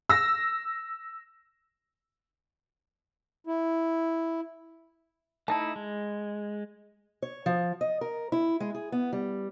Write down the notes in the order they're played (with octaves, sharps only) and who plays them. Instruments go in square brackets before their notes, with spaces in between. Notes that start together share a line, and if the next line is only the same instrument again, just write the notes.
[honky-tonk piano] E6 A#6
[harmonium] E4
[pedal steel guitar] A3 D#4 E4 [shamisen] A5
[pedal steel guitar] G#3
[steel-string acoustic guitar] C#5
F3
D#5
A#4
E4
G#3
G#4
B3
G3